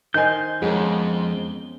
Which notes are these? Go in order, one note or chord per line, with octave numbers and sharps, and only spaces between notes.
D#3 C5 D#5 F5 G#5 G6
F2 G#3 B3 C#4 A#4